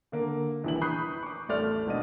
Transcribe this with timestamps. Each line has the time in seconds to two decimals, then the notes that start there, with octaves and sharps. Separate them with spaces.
0.12 D3 A#3
0.64 A#1 E3 F#7
0.81 B5 C#6 D#6 F#6 G6 C7
1.23 C#6 D6
1.49 A1 A3 D5 C6 F6
1.86 G#1 B2 D4 D#5 D#7